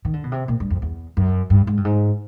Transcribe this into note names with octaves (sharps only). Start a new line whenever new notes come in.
D#3
D3
B2
C3
A#2
G2
F2
E2
F#2
G2
G#2
G2
G#2